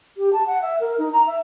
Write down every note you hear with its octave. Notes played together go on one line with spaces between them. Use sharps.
G4
A5
F#5
E5
A#4
D#4
A#5
E5